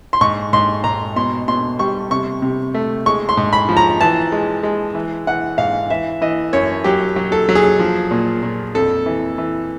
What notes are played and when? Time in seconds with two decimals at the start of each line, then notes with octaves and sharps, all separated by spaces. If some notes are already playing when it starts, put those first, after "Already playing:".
0.13 C6
0.21 G#2 C#6
0.53 G#2 C6
0.84 G#2 A#5
1.16 B2 C6
1.48 B2 C6
1.79 G3 C#6
2.11 C3 C#6
2.42 C3
2.74 A3
3.06 G#3 C#6
3.29 C6
3.37 G#2
3.53 B5
3.69 F3
3.77 A#5
4.01 E3 A5
4.32 G#3
4.63 G#3
4.95 E3
5.27 E3 F#5
5.58 G#2 F5
5.90 E3 E5
6.21 E3 D#5
6.53 F#2 C#5
6.84 F#3 G4
7.16 F#3
7.32 A4
7.49 F#3
7.55 G#4
7.79 F3
8.11 A#2
8.42 A#2
8.75 F2 A4
9.06 E3
9.38 E3